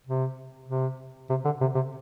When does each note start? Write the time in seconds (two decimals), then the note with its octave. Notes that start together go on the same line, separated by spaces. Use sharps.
0.07 C3
0.68 C3
1.29 C3
1.45 D3
1.61 C3
1.75 C3